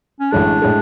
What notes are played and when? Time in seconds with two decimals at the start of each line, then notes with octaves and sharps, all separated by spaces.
0.20 C#4
0.32 A1 A2 G#3 D4
0.62 A2 G#3